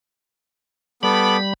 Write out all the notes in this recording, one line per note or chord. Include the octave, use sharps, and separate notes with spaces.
G3 B3 A4 B5 D6